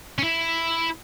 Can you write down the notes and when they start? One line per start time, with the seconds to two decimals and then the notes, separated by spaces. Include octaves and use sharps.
0.19 C#4
0.24 E4